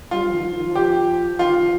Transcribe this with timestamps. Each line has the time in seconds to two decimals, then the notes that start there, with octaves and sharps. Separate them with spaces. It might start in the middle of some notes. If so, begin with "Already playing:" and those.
0.11 G3 F4
0.28 F3
0.35 D#3
0.44 F3
0.55 D#3
0.65 F3
0.75 G4
1.39 D#3 F4
1.57 F3